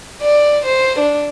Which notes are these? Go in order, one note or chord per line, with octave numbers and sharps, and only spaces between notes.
D5
C5
D4